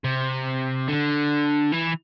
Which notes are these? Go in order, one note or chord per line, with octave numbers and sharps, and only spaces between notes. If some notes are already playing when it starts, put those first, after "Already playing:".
C3
D3
E3